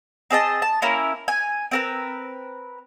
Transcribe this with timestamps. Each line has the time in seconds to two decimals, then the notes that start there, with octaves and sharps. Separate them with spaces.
0.30 C4 G#4 D#5 A5
0.62 A5
0.82 A#3 C#4 E4 A#4
1.28 G#5
1.71 C4 A#4 B4